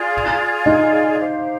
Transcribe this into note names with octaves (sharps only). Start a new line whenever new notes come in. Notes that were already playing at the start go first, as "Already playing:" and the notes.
Already playing: F4 G#4 D5
D#4
G4 C5 F5